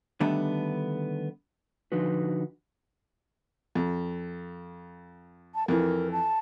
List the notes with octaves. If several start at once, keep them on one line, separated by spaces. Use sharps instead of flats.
D3 D#3 G3 A3 B3 D4
D3 F3 D#4 F#4 B4
F2
A5
F2 E3 A#4
A5